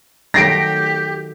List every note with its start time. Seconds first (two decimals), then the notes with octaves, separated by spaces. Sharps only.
0.34 D#3 F#3 A3 G4 A#6 C7 D7